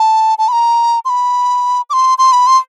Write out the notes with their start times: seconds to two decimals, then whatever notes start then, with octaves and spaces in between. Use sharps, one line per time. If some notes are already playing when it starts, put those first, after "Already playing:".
Already playing: A5
0.38 A5
0.48 B5
0.53 A#5
1.05 C6
1.09 B5
1.90 D6
1.93 C6
2.18 C6
2.32 B5
2.47 C6